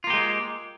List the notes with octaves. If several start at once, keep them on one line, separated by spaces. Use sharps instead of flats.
G#3 A#3 F4 G4